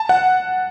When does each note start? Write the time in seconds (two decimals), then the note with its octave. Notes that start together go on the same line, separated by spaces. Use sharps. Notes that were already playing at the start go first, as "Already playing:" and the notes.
Already playing: A5
0.09 F#5